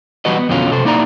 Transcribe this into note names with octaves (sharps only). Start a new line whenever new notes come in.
E3 F#3 G3 F#4 B4 D#5
B3
F2 B2 D3 F#3 C#4 F4
C3 A4 C5
A#3 D#4 E4 D5 A5 A#5